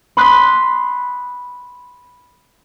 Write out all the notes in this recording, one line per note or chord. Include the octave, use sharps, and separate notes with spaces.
B5 C6 D#6 F#6 B6 C7